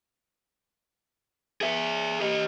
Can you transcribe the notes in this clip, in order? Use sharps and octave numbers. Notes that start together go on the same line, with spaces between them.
G#4 E5
G4 D#5